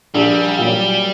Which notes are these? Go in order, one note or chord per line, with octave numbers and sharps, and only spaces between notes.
A#1 G3
A#2 F#3